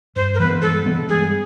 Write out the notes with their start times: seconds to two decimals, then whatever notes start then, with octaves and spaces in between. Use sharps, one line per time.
0.16 G2 C5
0.34 A#4
0.40 E3 G#3 B3 B4
0.62 G2 A4
0.86 E3 G#3 B3
1.09 G2 G#4